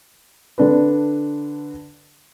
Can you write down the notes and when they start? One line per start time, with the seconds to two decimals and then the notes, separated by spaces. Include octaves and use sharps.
0.58 D3 D4 B4